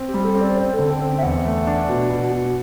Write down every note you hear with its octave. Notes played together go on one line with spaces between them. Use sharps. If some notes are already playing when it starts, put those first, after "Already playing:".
Already playing: C4
G4
G3
A4
C4
D5
C4 C5
A4
D3
G5
C4
G5
E5
E2 F#5
A3
D4
B2
B2
B2